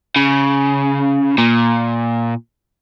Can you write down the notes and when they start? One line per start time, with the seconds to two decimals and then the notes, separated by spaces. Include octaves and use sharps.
0.16 C#3
1.38 A#2